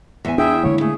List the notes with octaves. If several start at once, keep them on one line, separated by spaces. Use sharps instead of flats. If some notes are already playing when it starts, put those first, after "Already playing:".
E2 E5 G#5
E2 D4 E4 G#4 E5 G5
D3 G#3 A#3 C#5
A3 G#4